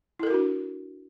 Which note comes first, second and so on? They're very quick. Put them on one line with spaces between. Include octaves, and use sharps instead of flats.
E4 A4 A#4 F#4 D4